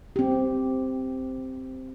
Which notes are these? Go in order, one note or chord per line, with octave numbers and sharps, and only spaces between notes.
C4 G4